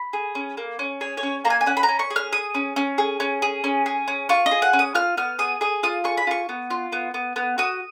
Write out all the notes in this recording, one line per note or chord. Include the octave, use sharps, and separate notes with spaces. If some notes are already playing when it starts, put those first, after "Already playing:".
Already playing: B5
G#4
C#4
A#3
C#4
G#4 C#5
C#5
C#4
A#3 A#5
G#5
G#5
C#4 F#5
B5
A#5
C#4
C#6
G#4
F6
G#4 D#6
C#4
C#4
G#4
C#4
G#4
C#4
G#4
C#4
F4 C#6
D#5
G#4
F#5
C#4
D#6
F4 F6
B3 F6
G#4 D#6
G#4 D#6
F4 D#6
G#4 C#6
B5
F4 C#6
B3
F4
B3
B3
B3
F#4 D#6